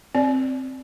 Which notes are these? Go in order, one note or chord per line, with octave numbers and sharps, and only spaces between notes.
C4 D5